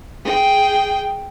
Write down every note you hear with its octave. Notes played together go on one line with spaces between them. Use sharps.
G#4 G5